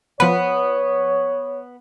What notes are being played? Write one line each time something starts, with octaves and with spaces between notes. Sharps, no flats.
F3 B3 B4 C#5